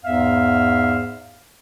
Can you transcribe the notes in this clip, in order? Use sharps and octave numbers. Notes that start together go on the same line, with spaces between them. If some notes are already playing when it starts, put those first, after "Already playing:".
E2 G#2 B3 E5 F5